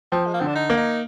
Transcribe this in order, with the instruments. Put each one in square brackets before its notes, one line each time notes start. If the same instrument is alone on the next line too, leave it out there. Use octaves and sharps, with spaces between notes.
[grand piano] F3 [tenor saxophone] C4
[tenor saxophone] G#3
A#3
[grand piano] D3 [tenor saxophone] C4
[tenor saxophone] D4
D#4
[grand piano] A#3
[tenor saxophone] D#4